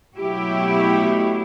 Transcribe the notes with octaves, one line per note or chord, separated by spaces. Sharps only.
B2 F#3 A3 E4 G4